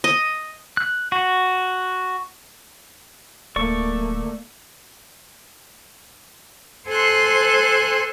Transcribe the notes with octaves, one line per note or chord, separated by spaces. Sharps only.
D#5
F#6
F#4
D1 A3 A#3 D5 C#6
A4 C5 G#5 C6 F#6